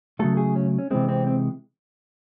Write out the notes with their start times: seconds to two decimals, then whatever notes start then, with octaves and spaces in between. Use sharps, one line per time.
0.19 C#3 F#3 A3 A4
0.37 G#4
0.56 C#4
0.78 C#4
0.91 C3 E3 G#3 C4
1.09 C4
1.27 C4